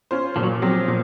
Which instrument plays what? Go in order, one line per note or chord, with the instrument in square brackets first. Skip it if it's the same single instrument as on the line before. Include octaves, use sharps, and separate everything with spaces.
[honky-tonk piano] C#4 F4 C5
[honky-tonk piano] A#2 [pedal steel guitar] F3
[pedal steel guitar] F#3
F3
[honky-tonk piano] F#3 C4
A#2